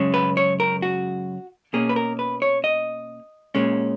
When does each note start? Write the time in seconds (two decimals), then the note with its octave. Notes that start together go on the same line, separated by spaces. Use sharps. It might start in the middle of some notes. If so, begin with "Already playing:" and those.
Already playing: F#2 C#3 G#3 C#4
0.14 B4
0.37 C#5
0.60 A#4
0.82 F#4
1.73 B2 A#3 C#4 G#4
1.89 B4
1.96 A#4
2.19 B4
2.42 C#5
2.64 D#5
3.55 A#2 G#3 C#4